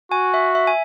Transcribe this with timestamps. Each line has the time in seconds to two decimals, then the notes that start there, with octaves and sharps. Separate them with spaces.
0.11 F#4 G#5
0.34 E5
0.55 E5
0.67 G#5